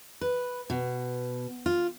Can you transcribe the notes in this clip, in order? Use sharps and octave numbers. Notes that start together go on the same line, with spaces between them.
B4
B2
F4